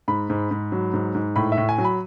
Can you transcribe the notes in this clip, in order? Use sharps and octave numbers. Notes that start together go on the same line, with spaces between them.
G#2 B5
G#2
G#2
F#3
G#2
G#2
A2 B5
E5
A2
G#5
F#3
B5